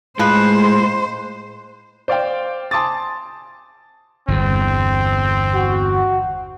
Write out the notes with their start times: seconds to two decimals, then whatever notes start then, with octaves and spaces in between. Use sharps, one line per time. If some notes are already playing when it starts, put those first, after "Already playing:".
0.19 A2 F3 G#3 B4 C5
2.08 C5 D5 F5 G5
2.71 G#5 A5 C6 D6 D#6 A6
4.28 G1 E2 C4
5.55 F#4